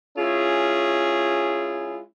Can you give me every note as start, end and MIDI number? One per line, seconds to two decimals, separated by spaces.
0.18 2.00 56
0.18 2.00 61
0.18 2.00 64
0.18 2.00 65
0.18 2.00 68